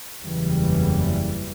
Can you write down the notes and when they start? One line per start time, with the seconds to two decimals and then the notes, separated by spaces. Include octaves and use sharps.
0.23 F#1 E2 C#3 E3 G3